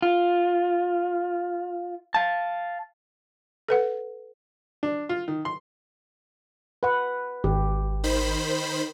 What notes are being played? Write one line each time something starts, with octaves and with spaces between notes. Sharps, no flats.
F4
F5 A5
A4 B4 F#5
D4
F4
D#3
C6
B4 F#5
G#1 G4
D#3 C5 B5